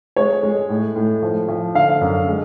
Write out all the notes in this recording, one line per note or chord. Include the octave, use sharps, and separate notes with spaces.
G#3 C#5
G#3
A2
A2
F3
F3
D3 F5
F#2
G#3